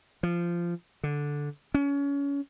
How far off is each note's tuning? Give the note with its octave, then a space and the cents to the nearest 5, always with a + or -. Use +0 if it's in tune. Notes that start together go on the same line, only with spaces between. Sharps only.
F3 -15
D3 -5
C#4 +25